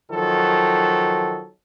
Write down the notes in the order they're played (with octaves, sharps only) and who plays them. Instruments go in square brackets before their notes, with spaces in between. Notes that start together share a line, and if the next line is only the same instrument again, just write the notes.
[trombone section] D#3 F3 F#3 A4